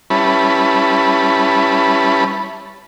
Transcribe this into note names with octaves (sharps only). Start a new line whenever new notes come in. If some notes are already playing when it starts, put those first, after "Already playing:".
G3 C#4 E4 B4 A5 B5